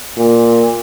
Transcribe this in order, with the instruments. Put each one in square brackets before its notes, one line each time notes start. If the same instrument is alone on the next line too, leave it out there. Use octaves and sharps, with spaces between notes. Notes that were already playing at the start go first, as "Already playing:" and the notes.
[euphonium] A#2